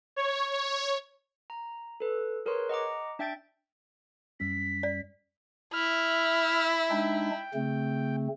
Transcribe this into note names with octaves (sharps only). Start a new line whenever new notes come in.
C#5
C#5
A#5
A4 B4
G#4 A#4 B4 C#5 C6
D#5 F#5 A#5 D6
D4 E5 G5 G6 A6 D7
F#2 G3 C#4 B6
D5
E4 E5 F6
G#3 D4 D#4 G5
C#3 A3 C4